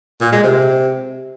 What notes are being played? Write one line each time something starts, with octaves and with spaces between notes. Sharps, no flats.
A#2
G#3
C3